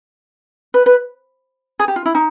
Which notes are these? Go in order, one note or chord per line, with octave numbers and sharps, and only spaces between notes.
B4
B4
G#4
G4
F4
E4
D#4